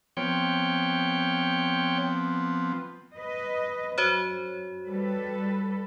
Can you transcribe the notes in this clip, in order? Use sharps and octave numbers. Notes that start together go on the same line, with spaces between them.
F3 B3 C4 C#5 G5
B4 D#5
F#2 F#4 C5 C#5
G3 A4 B4